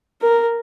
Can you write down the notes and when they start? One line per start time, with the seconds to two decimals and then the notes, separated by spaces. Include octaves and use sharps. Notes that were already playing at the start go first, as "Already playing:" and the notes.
0.22 A#4